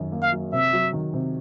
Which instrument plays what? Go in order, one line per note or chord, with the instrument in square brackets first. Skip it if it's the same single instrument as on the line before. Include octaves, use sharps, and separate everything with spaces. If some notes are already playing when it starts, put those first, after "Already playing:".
Already playing: [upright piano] F#2 D#3 F#3
A#3
[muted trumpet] F5
[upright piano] F#3
[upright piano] C3 [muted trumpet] E5
[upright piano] F#3
D#3
C3